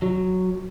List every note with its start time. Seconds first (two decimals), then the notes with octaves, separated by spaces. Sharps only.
0.02 F#3